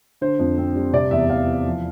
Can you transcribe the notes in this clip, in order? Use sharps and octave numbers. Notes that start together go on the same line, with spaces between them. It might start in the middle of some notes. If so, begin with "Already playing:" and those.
D3 C5
F2
C4
G3
C3 D5
E2 E5
E2 F5
E3
F3